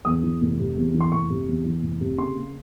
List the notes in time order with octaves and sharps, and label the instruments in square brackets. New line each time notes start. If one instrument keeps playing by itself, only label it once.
[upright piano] E2 D#6
E3
F1
C3
E2
E3
C6
F1 C#6
C3
E2
E3
F1
C3
C#3 C6
A#3